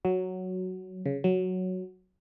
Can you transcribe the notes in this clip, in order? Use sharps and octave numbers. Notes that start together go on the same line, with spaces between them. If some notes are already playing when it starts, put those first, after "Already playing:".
F#3
C#3
F#3